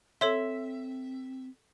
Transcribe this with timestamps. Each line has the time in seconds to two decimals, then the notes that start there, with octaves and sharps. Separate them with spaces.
0.21 C4 A4 C#5 E5 C6